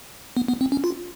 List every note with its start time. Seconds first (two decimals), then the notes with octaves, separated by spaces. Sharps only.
0.37 B3
0.48 B3
0.61 C4
0.72 C#4
0.84 F4